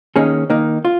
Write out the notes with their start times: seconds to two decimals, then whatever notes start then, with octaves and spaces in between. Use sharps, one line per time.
0.16 D#3 A#3 C#4 G#4
0.50 D#3 A#3 D#4
0.85 F4